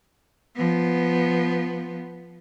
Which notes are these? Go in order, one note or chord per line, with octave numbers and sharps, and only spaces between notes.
F3 B3